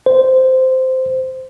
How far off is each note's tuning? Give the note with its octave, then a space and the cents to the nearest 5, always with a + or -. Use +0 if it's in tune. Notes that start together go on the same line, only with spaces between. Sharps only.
C5 -10